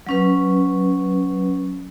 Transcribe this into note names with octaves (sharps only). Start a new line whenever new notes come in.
F#3 C#4 B4